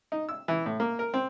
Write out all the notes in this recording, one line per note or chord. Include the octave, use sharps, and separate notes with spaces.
D#4
E6
E3
A2
A#3
A#4
C4